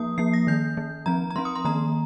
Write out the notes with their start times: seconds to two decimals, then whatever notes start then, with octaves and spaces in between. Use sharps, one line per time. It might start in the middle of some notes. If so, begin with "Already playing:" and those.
Already playing: F3 A#3 D#6
0.18 F3 A#3 C7
0.33 A#6
0.47 D#3 A#3 G6
0.77 D#3 A#3
1.06 F3 C4 A#5
1.30 A#5
1.36 F3 C4 C6
1.45 D#6
1.56 C6
1.65 D#3 A#3 A#5